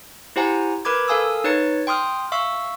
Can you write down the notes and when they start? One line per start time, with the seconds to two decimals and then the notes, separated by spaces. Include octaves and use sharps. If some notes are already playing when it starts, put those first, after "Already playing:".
0.36 E4 G4 C5 F#5 G#5 A#5
0.85 A#4 B4 B5 D6 G#6
1.08 A4 A#4 F5 G#5 D#6 E6
1.44 D#4 B4 C#5 A6 C#7
1.87 G5 C6 D#6 F6
2.32 E5 F5 C#6 E6